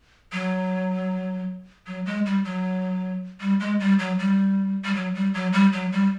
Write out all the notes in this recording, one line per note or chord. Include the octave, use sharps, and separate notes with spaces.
F#3
F#3
G#3
G3
F#3
G3
G#3
G3
F#3
G3
G3
F#3
G3
F#3
G3
F#3
G3